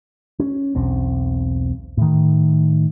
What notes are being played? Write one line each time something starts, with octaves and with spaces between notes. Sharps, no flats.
C#4
E1 B1 C4
A2 D#3